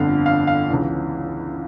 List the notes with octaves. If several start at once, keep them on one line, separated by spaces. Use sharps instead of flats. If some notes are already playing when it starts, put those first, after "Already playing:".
Already playing: G1 F2 D3 F5
F5
F5
C#2 C#3 E3